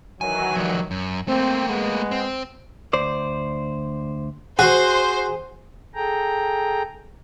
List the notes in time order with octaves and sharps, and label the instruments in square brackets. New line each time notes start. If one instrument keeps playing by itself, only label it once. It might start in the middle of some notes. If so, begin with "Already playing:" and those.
[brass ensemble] D#3 E3 F#3 [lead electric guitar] G#5
[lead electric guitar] F3 G3
F#2
[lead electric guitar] A3 A#3 [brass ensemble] C4
[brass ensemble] G#3 B3
[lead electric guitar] C4
[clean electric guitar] D2 C5 D5
[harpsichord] F#4 [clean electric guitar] G#4 [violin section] C5
[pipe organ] G#4 A4 G5 A#5